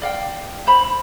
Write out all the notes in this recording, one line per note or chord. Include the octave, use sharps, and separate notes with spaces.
D5 F5 G5
C5 B5